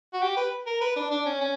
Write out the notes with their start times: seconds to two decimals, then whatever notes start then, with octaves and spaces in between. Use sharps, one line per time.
0.14 F#4
0.22 G4
0.37 B4
0.66 A#4
0.81 B4
0.96 D4
1.11 D4
1.26 C#4
1.41 C#4